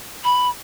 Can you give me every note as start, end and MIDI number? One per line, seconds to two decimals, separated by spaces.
0.24 0.48 83